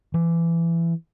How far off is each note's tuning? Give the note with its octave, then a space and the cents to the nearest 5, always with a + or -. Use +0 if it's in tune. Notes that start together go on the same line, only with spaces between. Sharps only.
E3 +25